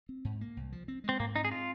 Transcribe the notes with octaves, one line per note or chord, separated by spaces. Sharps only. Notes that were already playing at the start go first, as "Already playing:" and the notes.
C4
G#2
A#3
C2
F3
C4
G#3 C4
G#2 A#3
C4 D#4
G#4
F4